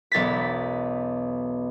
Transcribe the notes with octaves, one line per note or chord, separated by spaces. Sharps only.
E1 B1 A6 B6